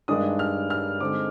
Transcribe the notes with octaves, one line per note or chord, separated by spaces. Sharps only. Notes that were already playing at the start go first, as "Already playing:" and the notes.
G2 D#3 G#3 D4 D#6
F6
F6
D3 G#3 C4 D#4 D6